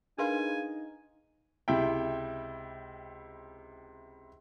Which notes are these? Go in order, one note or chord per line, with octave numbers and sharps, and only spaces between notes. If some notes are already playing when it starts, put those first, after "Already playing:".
D4 D#4 G#4 A#4 B4 F5 G#5 C6
C#2 C3 E4 G5